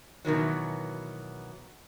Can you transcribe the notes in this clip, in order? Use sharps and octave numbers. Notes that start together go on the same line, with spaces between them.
B2 D#3 E3 F#3